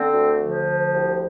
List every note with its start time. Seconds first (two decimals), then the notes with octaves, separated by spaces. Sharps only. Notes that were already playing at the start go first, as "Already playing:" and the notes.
Already playing: D3 C4
0.13 D2
0.39 D3 F3
0.66 D2
0.93 C2